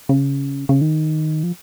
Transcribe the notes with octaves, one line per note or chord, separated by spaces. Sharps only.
C#3
C#3
D#3
F3